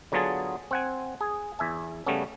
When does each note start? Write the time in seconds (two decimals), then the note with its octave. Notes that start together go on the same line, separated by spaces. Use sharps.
0.12 D3 F#3 B3 F4 G#4 A5
0.71 C4 F#5 G#5
1.21 G#4
1.59 E2 E5 G#5
2.06 C#3 G3 A3 B3 C#4